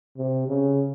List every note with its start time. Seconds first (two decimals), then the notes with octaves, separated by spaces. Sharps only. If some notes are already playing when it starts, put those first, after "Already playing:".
0.17 C3
0.48 C#3